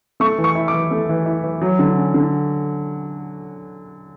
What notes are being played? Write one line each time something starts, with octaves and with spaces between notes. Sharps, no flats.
A3 C#6
E3
C#6
E4
D6
E3
A3
E3
E4
E3
F#3
D3
C#4
D3